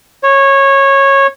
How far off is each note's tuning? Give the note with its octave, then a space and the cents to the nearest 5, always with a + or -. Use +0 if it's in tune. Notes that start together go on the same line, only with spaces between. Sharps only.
C#5 -15